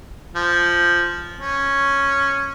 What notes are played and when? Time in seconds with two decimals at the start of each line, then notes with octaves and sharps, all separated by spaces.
0.36 F3
1.39 C#4